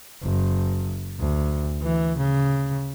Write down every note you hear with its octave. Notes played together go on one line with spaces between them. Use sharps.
F#1
D2
E3
C#3